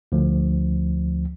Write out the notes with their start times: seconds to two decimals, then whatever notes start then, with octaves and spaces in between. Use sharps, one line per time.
0.12 D2 F3